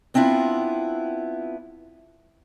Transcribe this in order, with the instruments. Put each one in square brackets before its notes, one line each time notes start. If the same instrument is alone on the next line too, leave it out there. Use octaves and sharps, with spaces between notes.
[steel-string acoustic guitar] B3 C4 D4 E4 F4